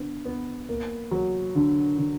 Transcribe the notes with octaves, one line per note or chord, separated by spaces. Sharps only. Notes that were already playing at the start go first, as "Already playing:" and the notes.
Already playing: D3 B3
B3
A#3
F#3
D3
D3